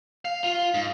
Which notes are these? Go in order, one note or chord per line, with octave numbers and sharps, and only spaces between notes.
F5
F4
G#2